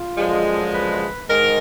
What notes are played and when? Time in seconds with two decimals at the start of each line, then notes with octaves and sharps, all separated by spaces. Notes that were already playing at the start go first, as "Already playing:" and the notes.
Already playing: F4
0.17 F#2 D3 F3 G#3
0.73 B4
1.28 G#2 D#3 G#3 A#4